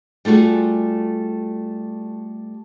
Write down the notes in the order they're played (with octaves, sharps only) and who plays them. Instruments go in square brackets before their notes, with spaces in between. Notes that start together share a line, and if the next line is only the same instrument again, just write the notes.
[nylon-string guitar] G3 A3 F4 F#4 G#4